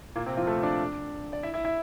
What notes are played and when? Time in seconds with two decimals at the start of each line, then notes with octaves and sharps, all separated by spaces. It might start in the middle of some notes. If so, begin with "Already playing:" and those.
0.16 A#2 A#3
0.26 C3 C4
0.37 F3 F4
0.47 A3 A4
0.63 D4 D5
1.33 D5
1.43 E4 E5
1.54 E4 E5
1.65 E4 E5